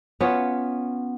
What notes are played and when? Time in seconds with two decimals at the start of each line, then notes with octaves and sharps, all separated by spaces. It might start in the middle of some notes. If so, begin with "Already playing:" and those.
0.21 B3 C#4 F4 C#5